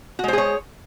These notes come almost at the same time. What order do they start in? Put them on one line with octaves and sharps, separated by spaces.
F#4 G#3 C5 G#4 C#5